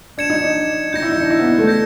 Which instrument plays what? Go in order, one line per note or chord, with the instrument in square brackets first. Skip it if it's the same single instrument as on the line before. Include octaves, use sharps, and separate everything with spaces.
[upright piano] D4 [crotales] G#6 C#7 E7
[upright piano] D#4
D4
[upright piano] D#4 [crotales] G6 A#6 C#7
[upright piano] E4
D#4
D4
E4
B3
A3
[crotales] G6 A#6 C#7